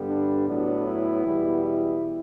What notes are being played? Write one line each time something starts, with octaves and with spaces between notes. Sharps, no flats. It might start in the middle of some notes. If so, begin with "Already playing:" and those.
Already playing: G2 D3 G3 B3
D4
A2 F#3 B3 D4
E4
E2 B2 G3 B3
E4